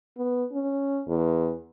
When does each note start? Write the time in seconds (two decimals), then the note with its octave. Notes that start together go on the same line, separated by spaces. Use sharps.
0.17 B3
0.53 C#4
1.08 E2